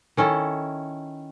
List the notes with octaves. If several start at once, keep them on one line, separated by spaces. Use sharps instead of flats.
D#3 C#4 E4 A4